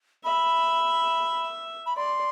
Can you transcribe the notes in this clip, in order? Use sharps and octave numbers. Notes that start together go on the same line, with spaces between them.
E5 B5
B5
D5 C6